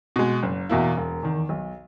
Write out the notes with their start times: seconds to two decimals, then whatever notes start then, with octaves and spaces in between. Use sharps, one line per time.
0.16 B2 G#3
0.43 F#1
0.69 E2 B2 A#3 E4
0.97 E1
1.23 E2 D#3
1.49 B1